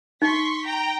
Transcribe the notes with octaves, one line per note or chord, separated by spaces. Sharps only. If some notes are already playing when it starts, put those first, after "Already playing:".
D#4 C6 C#6 B6
G5 A#5